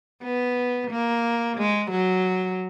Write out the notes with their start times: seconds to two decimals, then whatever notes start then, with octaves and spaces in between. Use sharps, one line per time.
0.23 B3
0.91 A#3
1.58 G#3
1.91 F#3